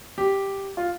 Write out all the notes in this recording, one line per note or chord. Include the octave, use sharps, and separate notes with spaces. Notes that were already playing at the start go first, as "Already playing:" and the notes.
G4
F4